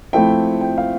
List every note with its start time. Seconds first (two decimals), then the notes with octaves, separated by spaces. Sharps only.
0.13 F3 A3 C4 E4 G5
0.61 G5
0.78 F5